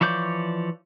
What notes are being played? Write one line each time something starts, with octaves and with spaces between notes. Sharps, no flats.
E3 F3 C#5 D5 G6